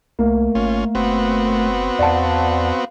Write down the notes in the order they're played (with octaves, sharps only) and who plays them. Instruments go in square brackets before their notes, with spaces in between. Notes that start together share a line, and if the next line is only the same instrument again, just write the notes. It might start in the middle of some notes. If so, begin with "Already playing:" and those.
[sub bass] C2 [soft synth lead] A3 [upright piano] A#3
[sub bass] G#1 [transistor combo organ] C#4 F4
[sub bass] F#1 [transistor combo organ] B3 C4 F#4
[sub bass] E2 [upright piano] D5 F#5 A5 [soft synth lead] F5